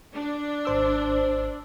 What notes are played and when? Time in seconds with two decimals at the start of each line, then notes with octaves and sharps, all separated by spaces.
0.13 D4
0.65 G#1 C5 E6